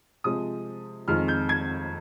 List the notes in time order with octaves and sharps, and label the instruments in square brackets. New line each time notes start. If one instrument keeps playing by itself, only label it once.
[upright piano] C3 F3 G#3 D#6
F2 D#3 G#3 F6
G6
G#6